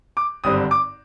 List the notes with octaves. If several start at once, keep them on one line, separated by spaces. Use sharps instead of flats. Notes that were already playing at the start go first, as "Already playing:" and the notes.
D6
G#1 G2 D3 G3 C4 D#6
D6